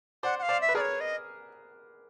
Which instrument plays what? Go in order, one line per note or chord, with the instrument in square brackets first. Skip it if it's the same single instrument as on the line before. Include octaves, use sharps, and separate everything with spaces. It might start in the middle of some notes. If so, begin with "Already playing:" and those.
[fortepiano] C5 D5 [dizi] F#5
[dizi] F#5
F5
[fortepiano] C5 D5
[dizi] E5
[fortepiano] B4
[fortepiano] G#4 A#4 [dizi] D5
[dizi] C#5
D#5